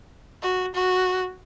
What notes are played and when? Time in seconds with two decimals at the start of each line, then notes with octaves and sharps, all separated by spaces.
0.43 F#4
0.75 F#4